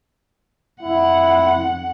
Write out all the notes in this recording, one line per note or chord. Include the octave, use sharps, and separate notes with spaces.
F2 E4 F#5